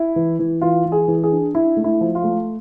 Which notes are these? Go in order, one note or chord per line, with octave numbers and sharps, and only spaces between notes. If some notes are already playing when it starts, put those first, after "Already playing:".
Already playing: E4
E3
E3
E3 F4
E3
G#4
E3
G#4
D4
D4 E4
A3
E4
F3
F4
A3